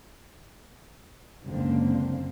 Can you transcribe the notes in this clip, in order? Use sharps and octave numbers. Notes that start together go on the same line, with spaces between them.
F#1 C#2 D3 A#3 C4